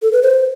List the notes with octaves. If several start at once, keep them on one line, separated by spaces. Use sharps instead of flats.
A4
B4
C5